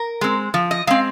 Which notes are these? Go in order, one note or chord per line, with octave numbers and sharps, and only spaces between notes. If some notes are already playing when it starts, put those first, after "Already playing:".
Already playing: A#4
G#3 C4
F3
D#5
G#3 C4 F5